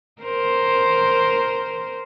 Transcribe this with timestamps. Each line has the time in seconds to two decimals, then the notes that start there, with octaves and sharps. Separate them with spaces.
0.23 A#4 C5